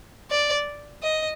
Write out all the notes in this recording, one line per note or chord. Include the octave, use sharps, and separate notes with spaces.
D5
D#5